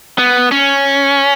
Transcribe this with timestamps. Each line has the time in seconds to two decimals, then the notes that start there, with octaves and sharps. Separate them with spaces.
0.18 B3
0.51 C#4